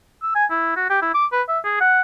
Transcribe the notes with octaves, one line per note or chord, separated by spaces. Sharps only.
E6
G#5
E4
F#4
G4
E4
D6
B4
E5
G#4
F#5